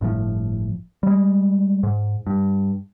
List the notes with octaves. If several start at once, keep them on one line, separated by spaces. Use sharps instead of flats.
G1 A2 C3 F3
G3 G#3
G#2
G2